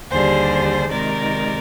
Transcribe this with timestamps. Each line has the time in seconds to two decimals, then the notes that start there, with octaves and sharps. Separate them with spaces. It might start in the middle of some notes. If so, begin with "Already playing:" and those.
0.11 D#2 D3 G3 G#4 C5
0.91 C3 D#3 G#3 D#4 A#4 D5